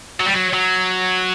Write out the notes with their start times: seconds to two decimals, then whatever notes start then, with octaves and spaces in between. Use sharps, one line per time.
0.20 F#3
0.26 G3
0.33 F#3
0.53 F#3